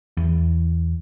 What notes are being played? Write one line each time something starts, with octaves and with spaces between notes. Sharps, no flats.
E2